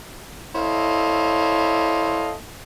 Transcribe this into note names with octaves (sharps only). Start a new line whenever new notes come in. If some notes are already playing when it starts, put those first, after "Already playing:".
E4 A4 C5 C#5 D#5 F5